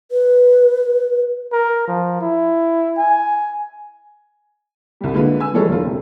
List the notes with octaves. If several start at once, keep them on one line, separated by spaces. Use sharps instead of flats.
B4
A#4
F3
E4
G#5
C2 G3
D3 G#3 A#3 F4 B4
B4 G#5 E6
E3 F3 G3 G#3 A4 C#5
E1 F3 F4
C3